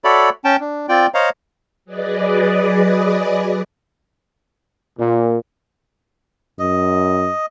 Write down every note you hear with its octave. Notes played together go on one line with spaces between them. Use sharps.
F#4 A4 C#5 D5 E5 B5
C#4 G5 A5
D4
C4 F4 D5 G5
C5 C#5 D#5 F5 A#5
F#3 G#4 B4 D5 D#5
A#2
F#2 D#5